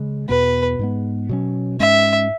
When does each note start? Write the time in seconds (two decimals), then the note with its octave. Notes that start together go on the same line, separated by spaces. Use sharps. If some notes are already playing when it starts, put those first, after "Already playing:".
Already playing: C#3 G#3
0.29 E2 B2 B3 B4
0.79 G#2 G#3 B3
1.29 B2 F#3 C#4
1.80 G#2 G#3 C#4 E5